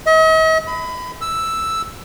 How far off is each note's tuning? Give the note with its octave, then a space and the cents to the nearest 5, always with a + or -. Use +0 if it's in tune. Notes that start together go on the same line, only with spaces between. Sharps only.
D#5 +45
B5 +25
E6 +0